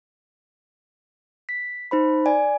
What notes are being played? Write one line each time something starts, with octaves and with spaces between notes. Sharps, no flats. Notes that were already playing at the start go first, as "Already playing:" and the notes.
B6
D#4 C5 B5
D5 G#5